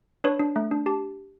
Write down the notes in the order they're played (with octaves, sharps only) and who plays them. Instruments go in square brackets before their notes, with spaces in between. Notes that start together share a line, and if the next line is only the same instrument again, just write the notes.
[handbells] D4 B4 C#5
D4
A3
D4
G4 A5